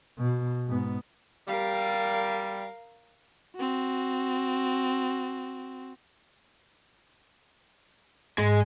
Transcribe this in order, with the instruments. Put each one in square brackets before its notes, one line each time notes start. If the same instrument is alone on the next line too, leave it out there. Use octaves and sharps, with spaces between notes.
[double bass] B2
G#2 B3
[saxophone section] G3 [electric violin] A#4 F5
[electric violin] C4 F#4
[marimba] G#2 [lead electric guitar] G#3